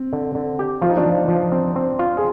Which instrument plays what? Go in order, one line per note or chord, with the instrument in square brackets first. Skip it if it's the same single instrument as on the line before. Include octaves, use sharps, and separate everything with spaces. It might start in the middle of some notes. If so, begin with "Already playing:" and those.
Already playing: [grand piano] C4
[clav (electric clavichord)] D3
D3
G4
[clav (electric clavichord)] F3 [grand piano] F4
[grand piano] D#4
D4 F4
[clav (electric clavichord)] F3
F3
C4
C4
F4
[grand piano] G#4